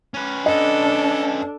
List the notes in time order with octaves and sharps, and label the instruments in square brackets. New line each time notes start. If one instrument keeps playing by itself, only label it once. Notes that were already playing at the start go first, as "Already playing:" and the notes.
[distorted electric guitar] C#4 B4
[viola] D4 [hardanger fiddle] A4 [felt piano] D#5